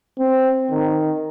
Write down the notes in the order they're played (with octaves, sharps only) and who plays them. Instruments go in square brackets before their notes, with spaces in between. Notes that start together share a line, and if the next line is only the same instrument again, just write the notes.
[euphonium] C4
D#3